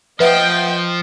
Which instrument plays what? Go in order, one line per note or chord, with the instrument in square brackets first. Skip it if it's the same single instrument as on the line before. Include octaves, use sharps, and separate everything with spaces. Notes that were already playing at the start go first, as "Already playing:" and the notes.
[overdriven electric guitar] F3 [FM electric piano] B4 E5 F#5 [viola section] D#5 G5